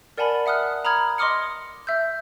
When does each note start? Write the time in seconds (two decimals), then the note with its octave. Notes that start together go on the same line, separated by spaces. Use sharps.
0.18 A#4 D5 F#5 G#5 A5 B5
0.46 E5 F#5 D#6 F6 F#6
0.85 A#5 B5 D#6 F6 G#6
1.18 D#5 C6 D6 D#6 F6 C#7
1.87 E5 E6 G6